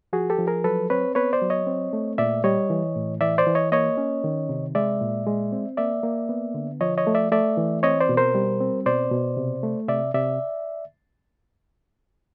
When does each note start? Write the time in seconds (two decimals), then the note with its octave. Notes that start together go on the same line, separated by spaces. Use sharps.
0.13 F3 F#4 G#4
0.30 G4 A4
0.39 F3
0.47 G#4 A#4
0.64 F#3 A4 B4
0.90 C4 B4 C#5
1.15 B3 B4 C#5
1.33 C5 D5
1.42 F#3
1.50 C#5 D#5
1.67 C4
1.93 A3
2.18 A#2 D5 E5
2.44 G3 C#5 D#5
2.70 E3
2.96 A2
3.21 E3 D5 E5
3.38 C5 D5
3.47 E3
3.55 C#5 D#5
3.72 A#3 C#5 D#5
3.98 C#4
4.24 D#3
4.49 C3
4.75 G#3 D5 E5
5.01 A#2
5.27 G#3
5.52 C4
5.77 A#3 D5 E5
6.03 A#3
6.29 B3
6.54 D3
6.81 F3 C#5 D#5
6.98 C#5 D#5
7.07 A3
7.15 D5 E5
7.32 A3 D5 E5
7.57 E3
7.83 C4 C#5 D#5
8.00 C5 D5
8.09 B2
8.17 A#4 C5
8.35 G3
8.60 C4
8.86 B2 C5 D5
9.12 B2
9.37 C3
9.63 A3
9.88 C3 D5 E5
10.14 C3 D5 E5